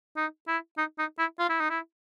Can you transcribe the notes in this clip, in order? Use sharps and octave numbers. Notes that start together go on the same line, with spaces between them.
D#4
E4
D#4
D#4
E4
F4
E4
D#4
E4